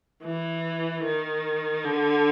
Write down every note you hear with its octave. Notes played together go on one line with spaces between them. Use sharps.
E3
D#3
D3